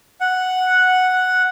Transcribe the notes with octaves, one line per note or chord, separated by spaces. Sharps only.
F#5